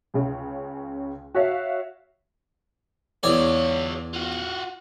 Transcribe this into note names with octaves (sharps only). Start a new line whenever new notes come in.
C#2 C#3
F#4 C#5 E5 F5
E2 F4 C#5 D5
F4 F#4